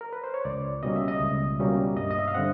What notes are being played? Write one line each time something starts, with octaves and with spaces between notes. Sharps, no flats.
A#4
B4
C5
C#5
C#2 D5
B2 G3 A#3 C#4 D#5
E5
D#5
C#2
B2 G3 A#3 C#4
G2 D#5
D#5
E5
F5
D3 G3 C4 F#5